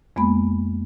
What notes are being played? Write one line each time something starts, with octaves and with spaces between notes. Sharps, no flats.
F2 G#3 A#3 B3 B5